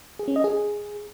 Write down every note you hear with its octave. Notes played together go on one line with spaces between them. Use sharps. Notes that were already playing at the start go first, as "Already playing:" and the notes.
G#4
C#4
D#5
G#4